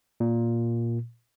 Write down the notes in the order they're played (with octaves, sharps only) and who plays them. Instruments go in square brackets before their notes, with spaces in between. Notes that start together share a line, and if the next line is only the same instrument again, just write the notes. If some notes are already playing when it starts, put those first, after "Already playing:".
[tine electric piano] A#2